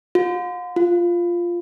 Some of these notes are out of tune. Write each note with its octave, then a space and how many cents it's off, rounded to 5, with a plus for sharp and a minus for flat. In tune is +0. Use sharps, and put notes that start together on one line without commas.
F4 +45
F4 -5